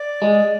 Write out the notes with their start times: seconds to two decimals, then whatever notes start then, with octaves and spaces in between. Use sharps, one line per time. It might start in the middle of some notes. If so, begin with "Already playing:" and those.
Already playing: D5
0.22 G#3